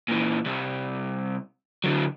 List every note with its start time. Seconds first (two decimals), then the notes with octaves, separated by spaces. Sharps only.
0.08 A#2 E3
0.46 C2 C3
1.84 D3 F#3